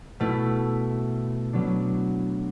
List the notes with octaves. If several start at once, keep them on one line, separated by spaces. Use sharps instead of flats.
B2 A3 E4
B2 F#3 B3 D4